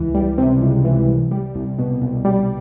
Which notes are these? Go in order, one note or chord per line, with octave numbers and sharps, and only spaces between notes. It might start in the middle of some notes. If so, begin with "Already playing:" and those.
Already playing: C#2 E3
G3
C3
C#2
E3
C2
G3
C2
B2
C2
G3